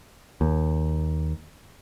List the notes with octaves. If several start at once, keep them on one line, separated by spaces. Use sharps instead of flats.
D#2